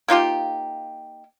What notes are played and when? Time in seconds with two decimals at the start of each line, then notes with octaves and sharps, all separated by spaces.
0.08 A#3 D#4 F4 G4